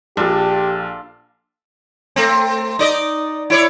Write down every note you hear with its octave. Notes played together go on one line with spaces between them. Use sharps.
A#1 D4 F4 G4 A4
A3 C4
D#4 D5 D#5
E4 C#5 D5